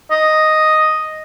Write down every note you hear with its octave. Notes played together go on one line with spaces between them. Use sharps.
D#5